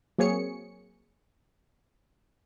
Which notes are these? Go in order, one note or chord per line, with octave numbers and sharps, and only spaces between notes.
F#3 A#3 C4 G#4 C#5 C#7